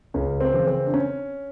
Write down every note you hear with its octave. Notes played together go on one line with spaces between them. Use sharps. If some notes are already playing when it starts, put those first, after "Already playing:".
C#2 C#4
C4
C#3 E3
C4
D4
C#4